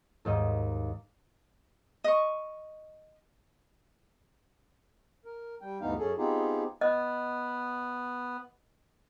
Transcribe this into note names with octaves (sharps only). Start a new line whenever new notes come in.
D#2 G#2 D#4 D#5
D#5 C#6
A#4
G3 G5
D2 G2 E3 B3 D#4 F5
F#2 C#4 G#4 A4
B3 C4 D#4 F4 G4 G#4
B3 D#5